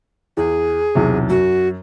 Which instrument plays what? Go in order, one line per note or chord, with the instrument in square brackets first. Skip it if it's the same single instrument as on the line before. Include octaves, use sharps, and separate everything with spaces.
[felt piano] E2 [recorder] G#4
[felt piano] B1 E2 C3
[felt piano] F#2 [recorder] F#4